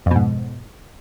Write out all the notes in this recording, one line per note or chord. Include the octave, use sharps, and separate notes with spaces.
F2 G#2 B2